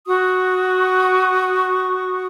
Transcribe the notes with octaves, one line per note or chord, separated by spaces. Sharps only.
F#4 C#6 D#6